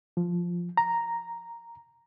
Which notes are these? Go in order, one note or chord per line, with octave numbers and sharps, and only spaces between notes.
F3
A#5